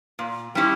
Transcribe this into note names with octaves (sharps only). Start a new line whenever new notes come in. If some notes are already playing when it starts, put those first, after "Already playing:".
A#2
G3 C#4 E4 G4